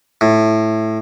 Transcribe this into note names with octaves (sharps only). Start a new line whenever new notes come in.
A2